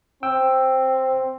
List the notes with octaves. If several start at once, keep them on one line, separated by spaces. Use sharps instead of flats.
C4 G5 E6